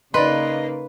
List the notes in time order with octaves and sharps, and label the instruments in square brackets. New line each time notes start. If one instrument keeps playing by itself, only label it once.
[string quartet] C#3 A#3 D#4 [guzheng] B4 [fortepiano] D5 C6 [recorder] D#5